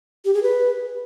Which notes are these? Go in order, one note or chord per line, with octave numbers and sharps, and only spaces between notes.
G4
G#4
B4